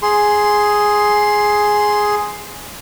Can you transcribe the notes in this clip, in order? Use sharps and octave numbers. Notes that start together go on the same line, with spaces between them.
G#4 C6